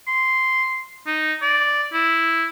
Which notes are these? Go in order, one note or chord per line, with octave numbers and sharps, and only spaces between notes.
C6
D#4
D5
E4